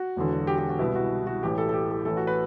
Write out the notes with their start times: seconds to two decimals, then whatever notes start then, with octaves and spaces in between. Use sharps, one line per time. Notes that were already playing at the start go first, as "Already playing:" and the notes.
Already playing: F#4
0.16 E1 E2 D3
0.47 G4
0.58 G4
0.69 F#4
0.79 C2 B2 E4
0.95 F#4
1.27 F#4
1.43 A1 A2 E3 G4
1.58 A4
1.69 A4
1.74 G4
1.90 A4
2.05 A1 A2 E3 A4
2.17 F#4
2.27 B4